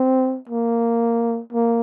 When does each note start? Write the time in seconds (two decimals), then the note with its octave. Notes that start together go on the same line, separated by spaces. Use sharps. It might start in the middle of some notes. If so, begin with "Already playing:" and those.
Already playing: C4
0.49 A#3
1.52 A#3